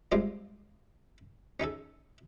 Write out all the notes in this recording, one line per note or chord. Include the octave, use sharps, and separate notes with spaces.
G3 G#3 C4 D4 F4
C#4 D#4 G#4 A4